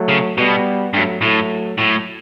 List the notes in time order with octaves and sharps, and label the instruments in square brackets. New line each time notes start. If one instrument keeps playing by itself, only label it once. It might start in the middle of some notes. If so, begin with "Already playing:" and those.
Already playing: [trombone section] F#3 A3
[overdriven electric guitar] C#3
[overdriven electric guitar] B2 [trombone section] G3 B3
[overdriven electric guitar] G2 [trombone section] F#3 A3
[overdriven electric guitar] A2 [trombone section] F#3 A3
[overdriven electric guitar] A2 [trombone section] F#3 A3